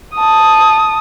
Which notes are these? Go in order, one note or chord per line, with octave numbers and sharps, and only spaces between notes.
A5 D#6